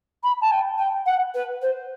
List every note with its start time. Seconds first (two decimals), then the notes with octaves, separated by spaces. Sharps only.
0.23 B5
0.41 A5
0.51 G5
0.77 G5
1.05 F#5
1.34 B4
1.61 C5